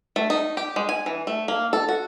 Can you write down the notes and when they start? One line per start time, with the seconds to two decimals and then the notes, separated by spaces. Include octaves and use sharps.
0.16 A3
0.30 D#4
0.57 G4
0.76 G#3
0.89 G#5
1.06 E3
1.27 A3
1.48 A#3
1.73 A4
1.89 F#4